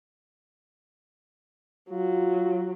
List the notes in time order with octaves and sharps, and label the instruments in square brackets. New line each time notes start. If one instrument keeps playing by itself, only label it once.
[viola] F#3 [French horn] F4